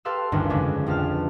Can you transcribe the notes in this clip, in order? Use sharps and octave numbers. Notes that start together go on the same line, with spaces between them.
G4 A4 B4 F5 C6 E6
G1 D2 G2 D#3 C#4
F2 C#3 G#3 A3 C#4 D4
A1 F2 F5 A5 F6